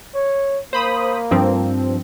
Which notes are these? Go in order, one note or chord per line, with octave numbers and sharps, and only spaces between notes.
C#5
A#3 C5 B5 D#6
G2 F3 C4